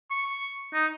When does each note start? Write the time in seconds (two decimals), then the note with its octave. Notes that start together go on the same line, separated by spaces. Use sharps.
0.11 C#6
0.74 D#4